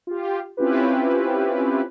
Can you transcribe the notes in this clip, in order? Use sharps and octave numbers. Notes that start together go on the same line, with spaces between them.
F4 G4
C4 C#4 E4 F4 G4 B4